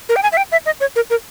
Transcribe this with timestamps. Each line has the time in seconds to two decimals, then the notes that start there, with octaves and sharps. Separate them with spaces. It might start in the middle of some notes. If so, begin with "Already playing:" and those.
0.09 A#4
0.16 G5
0.23 G#5
0.32 E5
0.37 G5
0.52 E5
0.66 D#5
0.80 C#5
0.96 A#4
1.10 A#4